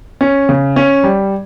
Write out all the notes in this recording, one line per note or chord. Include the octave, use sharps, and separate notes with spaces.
C#4
C#3
C#4
G3